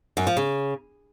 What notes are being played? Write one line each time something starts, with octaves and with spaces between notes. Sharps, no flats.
F#2
F3
C#3